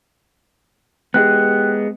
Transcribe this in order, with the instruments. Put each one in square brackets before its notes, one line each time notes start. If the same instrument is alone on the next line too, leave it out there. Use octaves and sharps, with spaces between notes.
[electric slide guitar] G#3 B3 [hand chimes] G4 G5 F#6